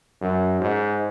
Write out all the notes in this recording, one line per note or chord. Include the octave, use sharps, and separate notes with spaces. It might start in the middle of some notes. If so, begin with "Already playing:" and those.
F#2
G#2